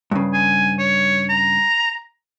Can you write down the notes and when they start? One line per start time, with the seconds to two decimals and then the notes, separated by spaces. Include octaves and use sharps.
0.11 G2 C#3
0.33 G#5
0.79 C#5
1.29 A#5